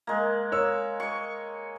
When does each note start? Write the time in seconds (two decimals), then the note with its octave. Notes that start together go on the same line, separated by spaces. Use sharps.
0.07 G#3 A#3
0.52 A#4 C#5 E6
1.00 D#5 C#6